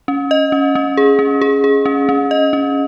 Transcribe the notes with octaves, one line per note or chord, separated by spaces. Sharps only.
C#4
D#5
C#4
C#4
G#4
C#4
G#4
G#4
C#4
C#4
D#5
C#4